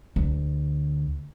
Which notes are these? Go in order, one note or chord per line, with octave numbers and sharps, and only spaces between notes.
D2